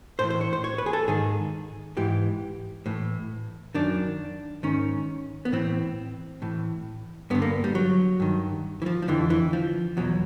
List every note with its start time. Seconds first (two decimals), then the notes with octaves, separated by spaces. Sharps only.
0.19 A2 E3 C5
0.30 C5
0.41 C#5
0.53 C5
0.64 C#5
0.78 B4
0.86 G#4
0.93 A4
1.08 G#2 D#3 G#4
1.97 G#2 E3 G4
2.86 A2 E3
3.75 F#2 D#3 D4
4.63 G#2 D#3 C#4
5.45 B3
5.52 A2 E3 C4
6.42 A2 E3
7.30 G2 B3
7.35 D3
7.42 A#3
7.64 G3
7.75 F#3
8.20 G2 D#3
8.82 E3
8.86 F3
9.02 F3
9.08 F2 D3 E3
9.30 E3
9.53 F3
9.97 E2 B2 F#3